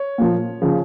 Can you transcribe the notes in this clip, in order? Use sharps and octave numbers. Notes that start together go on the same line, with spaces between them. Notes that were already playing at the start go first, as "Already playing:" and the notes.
Already playing: C#5
A#2 F3
C#3 F3